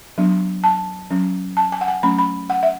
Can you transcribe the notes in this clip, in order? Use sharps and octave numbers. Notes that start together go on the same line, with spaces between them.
F#3 B3 D4
A5
F#3 C#4
A5
G#5
F#5
G#5
F#3 A3 C#4 B5
B5
F#5
E5